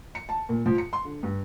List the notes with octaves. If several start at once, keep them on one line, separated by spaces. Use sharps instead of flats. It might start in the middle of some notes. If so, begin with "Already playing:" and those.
C#7
A5
A#2
F3
C#7
C6
D3
G2